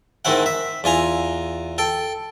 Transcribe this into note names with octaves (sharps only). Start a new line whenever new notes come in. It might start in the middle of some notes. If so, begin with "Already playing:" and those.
G#2 D#3 C4 E4 F#5
E5
E2 F4 G#5 A#5
A4 G5